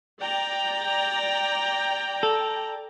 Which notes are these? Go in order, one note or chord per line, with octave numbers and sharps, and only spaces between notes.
D5 G5 A#5
A4